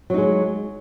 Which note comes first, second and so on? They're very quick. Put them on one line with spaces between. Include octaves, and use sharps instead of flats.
F#3 D#4 G#3